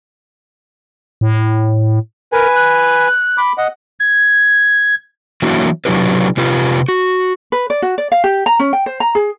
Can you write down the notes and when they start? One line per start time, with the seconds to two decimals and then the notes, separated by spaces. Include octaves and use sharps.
1.21 A2
2.32 A#4 B4 G#5
2.55 F#6
3.38 B5 D6
3.58 D#5 F#5
4.00 G#6
5.42 E3 F#3 A#3 D4 E4 F#4
5.85 C3 F#3 D4 E4 G4 B4
6.37 C3 F4 G4 B4
6.89 F#4
7.52 B4
7.70 D5
7.82 F#4
7.98 D5
8.12 F5
8.24 G4
8.46 A#5
8.59 C#4
8.73 G5
8.86 C5
9.00 A#5
9.15 G#4